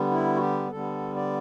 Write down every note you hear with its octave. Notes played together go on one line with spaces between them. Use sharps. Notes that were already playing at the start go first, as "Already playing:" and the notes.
Already playing: D3 G3 B3
E4
F#4
G4
D3 G3 B3 A4
D5